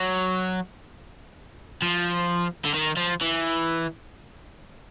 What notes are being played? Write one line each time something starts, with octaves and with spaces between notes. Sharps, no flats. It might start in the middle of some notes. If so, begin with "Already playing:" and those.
Already playing: F#3
F3
D3
D#3
F3
E3